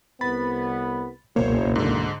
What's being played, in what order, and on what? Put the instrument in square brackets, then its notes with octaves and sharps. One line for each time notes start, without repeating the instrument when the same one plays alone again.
[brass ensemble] C2 B3 [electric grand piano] B5 [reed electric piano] A6
[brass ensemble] F#1 [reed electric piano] C#2 B2 A#3 [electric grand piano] C5 C#5
[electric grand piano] G#2 D3